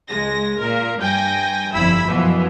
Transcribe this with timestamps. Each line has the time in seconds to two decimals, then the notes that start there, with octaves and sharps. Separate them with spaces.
0.10 C#2 G#3 A#6
0.61 A#2 A#4
1.00 G2 G5 G#5 A#6
1.75 G1 F2 G3 E4 B5 E6
2.08 F#2 B2 E3 F3